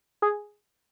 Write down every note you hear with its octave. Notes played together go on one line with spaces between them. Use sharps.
G#4